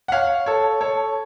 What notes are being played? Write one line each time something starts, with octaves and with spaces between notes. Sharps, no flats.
F#5
C#5 F5
A4 C#5
A4 C#5